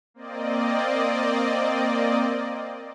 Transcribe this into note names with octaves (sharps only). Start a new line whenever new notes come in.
A#3 C4 D5 D#5